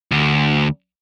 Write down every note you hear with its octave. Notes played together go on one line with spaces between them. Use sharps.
D2